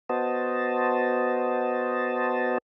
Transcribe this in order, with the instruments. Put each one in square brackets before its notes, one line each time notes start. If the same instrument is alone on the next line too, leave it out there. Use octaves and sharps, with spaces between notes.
[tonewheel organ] B3 F#4 C5 D#5 A5